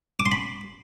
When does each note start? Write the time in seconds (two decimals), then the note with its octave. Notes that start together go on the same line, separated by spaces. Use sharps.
0.20 D6
0.26 C6
0.32 B5